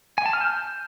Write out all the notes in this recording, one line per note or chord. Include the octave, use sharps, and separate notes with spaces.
G#5
A5
F6
G6